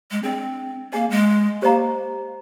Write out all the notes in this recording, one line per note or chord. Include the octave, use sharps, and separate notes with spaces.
G#3
C4 D4 G#4 D#5
A#3 G#4 D#5 G#5
G#3
A#3 G4 C5 D#5 A#5